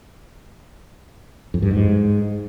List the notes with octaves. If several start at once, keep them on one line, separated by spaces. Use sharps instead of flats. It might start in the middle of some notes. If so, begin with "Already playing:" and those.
F2
G2
G#2